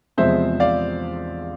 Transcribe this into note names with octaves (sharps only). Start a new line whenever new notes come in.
E2 C3 F3 G#3 C4 C5 E5
D5 F5